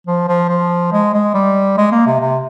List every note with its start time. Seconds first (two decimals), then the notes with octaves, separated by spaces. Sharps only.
0.07 F3
0.28 F3
0.49 F3
0.92 G#3
1.14 G#3
1.34 G3
1.78 G#3
1.92 A#3
2.06 C3
2.21 C3